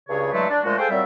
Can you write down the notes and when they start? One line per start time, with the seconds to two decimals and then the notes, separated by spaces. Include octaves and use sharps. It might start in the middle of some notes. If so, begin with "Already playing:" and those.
0.09 C#2 G2 C#3 G#4 C#5
0.32 G2 E3 F#3 G#3 A3
0.49 D4
0.64 A#2 F3 G#3 A3 F#4
0.78 G#4 A4 C5 F5 G5 G#5
0.90 A#2 F#3 G3 C4 E5